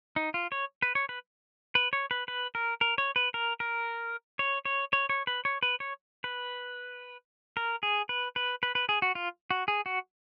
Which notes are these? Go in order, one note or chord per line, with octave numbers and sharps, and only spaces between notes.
D#4
F4
C#5
B4
C#5
B4
B4
C#5
B4
B4
A#4
A#4
C#5
B4
A#4
A#4
C#5
C#5
C#5
C#5
B4
C#5
B4
C#5
B4
A#4
G#4
B4
B4
B4
B4
G#4
F#4
F4
F#4
G#4
F#4